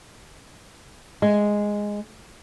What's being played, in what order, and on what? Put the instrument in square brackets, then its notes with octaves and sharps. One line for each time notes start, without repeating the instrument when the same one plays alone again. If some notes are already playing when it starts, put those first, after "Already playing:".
[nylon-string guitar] G#3